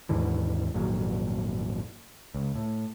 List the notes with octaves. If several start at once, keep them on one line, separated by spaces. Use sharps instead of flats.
D#2 G#2 D3 E3
G#1 F2 A#2 F#3
C#2
A2